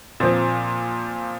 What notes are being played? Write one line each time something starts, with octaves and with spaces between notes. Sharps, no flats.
A#2 F3 C4